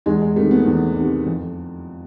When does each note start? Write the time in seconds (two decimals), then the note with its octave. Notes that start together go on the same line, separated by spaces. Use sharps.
0.06 E2 G#3
0.21 G#3
0.36 C3 D#3 A3
0.51 B3
0.66 E2
0.96 C3 D#3
1.26 F2